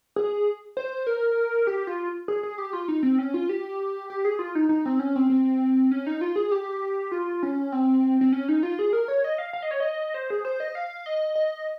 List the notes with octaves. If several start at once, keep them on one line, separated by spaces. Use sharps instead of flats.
G#4
C5
A#4
G4
F4
G#4
G#4
G4
F4
D#4
C4
C#4
F4
G4
G4
G#4
F4
D#4
D#4
C4
C#4
C4
C4
C#4
D#4
F4
G#4
G4
F4
C#4
C4
C4
C#4
D#4
F4
G#4
A#4
C#5
D#5
F5
F5
D#5
C#5
D#5
C5
G#4
C5
D#5
F5
D#5
D#5